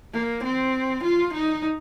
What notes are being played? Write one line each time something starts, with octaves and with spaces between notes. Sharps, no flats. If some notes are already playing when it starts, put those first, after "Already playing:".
A#3
C4
F4
D#4